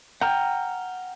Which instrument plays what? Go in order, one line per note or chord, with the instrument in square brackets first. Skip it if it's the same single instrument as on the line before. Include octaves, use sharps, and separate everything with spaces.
[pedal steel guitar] F#5 A#5 F6 [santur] G5